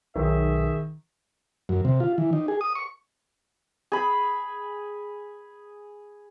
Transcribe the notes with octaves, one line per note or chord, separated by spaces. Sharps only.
B1 D#3 G#4 E5
F#2
C3
F4
E3
D#4
G#4
D#6
C#6
G#4 B5